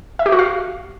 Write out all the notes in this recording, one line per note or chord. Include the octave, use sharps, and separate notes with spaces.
E5
G4
F#4
F5